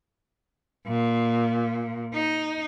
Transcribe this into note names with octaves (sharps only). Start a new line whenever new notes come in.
A#2
D#4